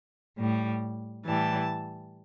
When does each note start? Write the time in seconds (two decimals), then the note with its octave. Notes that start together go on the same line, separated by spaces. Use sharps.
0.37 A2 G3
1.24 A2 E3 G3 A5